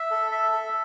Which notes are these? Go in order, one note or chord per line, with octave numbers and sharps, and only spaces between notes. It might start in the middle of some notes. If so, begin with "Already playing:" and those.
Already playing: E5
A4
E5
A4